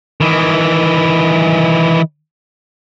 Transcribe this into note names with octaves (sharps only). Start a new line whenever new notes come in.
D#3 E3